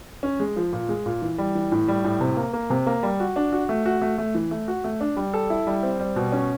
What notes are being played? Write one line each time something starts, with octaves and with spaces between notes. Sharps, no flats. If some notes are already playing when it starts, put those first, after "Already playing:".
C#4
G#3
F3
A#2
G#3
A#2
E3
G3
E3
A2
G3
A2
C3
A#3
A#3
C3
A#3
G3
F#4
D4
F#4
A3
F#4
A3
A3
E3
A3
F#4
A3
D4
G3
A4
E4
G3
C4
G3
B2
C#4